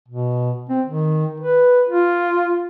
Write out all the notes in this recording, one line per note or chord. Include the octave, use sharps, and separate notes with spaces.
B2
C4
D#3
B4
F4